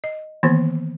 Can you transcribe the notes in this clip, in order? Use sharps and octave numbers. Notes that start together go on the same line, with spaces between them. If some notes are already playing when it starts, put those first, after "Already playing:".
D#5
D#3 E3 A#3 B3